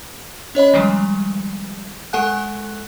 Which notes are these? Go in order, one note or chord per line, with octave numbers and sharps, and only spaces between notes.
C#4 C#5 D#5 B5
D#3 F3 G3 G#3
G#3 A4 F#5 G#5 F#6